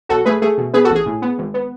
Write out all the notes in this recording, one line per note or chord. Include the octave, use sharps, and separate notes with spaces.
B1 F#4 A4
A3 G#4 B4
A3 G#4
B2
B3 G#4 B4
F#4 A4
A1
G#4
A2
B3
G#1
B3